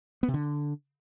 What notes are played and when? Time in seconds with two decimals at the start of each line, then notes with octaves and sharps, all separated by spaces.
0.23 B3
0.28 C3
0.34 D3